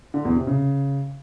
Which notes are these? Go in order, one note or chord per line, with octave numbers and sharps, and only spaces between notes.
D3
E2
C3
C#3